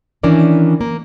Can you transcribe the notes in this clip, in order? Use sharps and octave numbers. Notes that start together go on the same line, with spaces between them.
D#3 E3 C#4 D4 A#4 D5
A#3